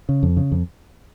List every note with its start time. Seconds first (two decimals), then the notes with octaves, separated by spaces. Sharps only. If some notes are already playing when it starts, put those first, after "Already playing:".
0.09 C#3
0.23 F2
0.37 C#3
0.52 F2